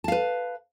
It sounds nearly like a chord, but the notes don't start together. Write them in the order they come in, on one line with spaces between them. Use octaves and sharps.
A5 F5 B4